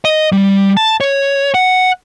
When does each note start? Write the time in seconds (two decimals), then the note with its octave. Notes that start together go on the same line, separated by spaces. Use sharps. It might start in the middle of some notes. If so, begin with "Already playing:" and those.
0.05 D#5
0.32 G3
0.77 A5
1.01 C#5
1.54 F#5